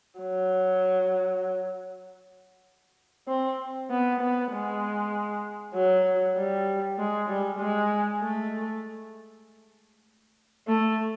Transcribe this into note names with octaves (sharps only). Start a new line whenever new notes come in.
F#3
C4
B3
B3
G#3
F#3
G3
G#3
G3
G#3
A3
A3